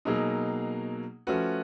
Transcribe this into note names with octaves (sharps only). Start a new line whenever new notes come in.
B2 F#3 A#3 D#4 G#4
F3 A3 C#4 F#4 B4